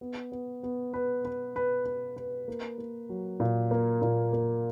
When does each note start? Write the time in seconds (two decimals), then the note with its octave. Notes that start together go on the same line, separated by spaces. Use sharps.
0.01 B3
0.32 B3
0.63 B3
0.94 B4
1.25 B4
1.56 B4
1.86 B4
2.16 B4
2.48 A#3
2.78 A#3
3.09 F#3
3.40 A#2
3.71 A#3
4.02 A#2
4.33 A#3